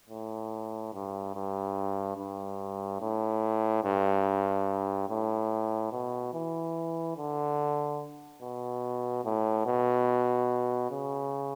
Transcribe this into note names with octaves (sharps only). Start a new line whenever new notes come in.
A2
G2
G2
G2
A2
G2
A2
B2
E3
D3
B2
A2
B2
C#3